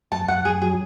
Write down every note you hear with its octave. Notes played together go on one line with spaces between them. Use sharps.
F#2 A5
F#2 F#5
F#2 G#4
F#3 G#4